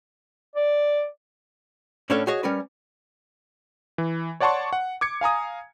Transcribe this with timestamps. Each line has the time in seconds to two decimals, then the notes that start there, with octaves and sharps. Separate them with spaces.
0.56 D5
2.10 A2 C#4 D4 A4 C#5 F5
2.27 F#4 G#4 C#5 D#5
2.43 G3 C#4 A#4 B4
3.98 E3
4.40 C#5 D5 F#5 A5 C6 C#6
4.73 F#5
5.01 D6 G#6 C#7
5.21 F5 G#5 A#5 D#6